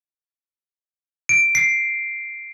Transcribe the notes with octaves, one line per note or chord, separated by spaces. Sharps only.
D7
C7